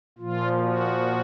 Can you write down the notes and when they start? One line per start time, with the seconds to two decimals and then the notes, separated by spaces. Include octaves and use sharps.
0.18 A#2 F3 F4
0.62 F#4